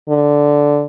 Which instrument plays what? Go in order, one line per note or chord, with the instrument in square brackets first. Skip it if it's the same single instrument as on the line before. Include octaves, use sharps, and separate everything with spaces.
[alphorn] D3